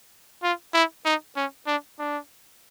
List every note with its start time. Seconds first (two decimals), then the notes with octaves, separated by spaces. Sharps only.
0.43 F4
0.74 E4
1.05 D#4
1.36 C#4
1.67 D4
1.99 D4